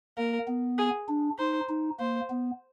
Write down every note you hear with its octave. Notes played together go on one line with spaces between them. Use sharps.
A#3 A#4
B3
G#4
D4
D#4 C5
D#4
A#3 C5
B3